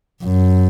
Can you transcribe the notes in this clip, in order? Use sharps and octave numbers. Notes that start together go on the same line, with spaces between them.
F#2